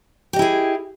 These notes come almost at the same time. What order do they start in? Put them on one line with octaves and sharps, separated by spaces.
G4 D#5 E4 G#4